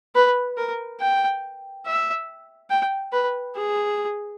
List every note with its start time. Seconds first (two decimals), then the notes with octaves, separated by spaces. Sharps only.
0.15 B4
0.57 A#4
1.00 G5
1.86 E5
2.70 G5
3.12 B4
3.55 G#4